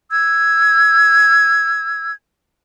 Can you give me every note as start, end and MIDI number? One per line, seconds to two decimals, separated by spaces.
0.11 2.11 88
0.11 2.11 92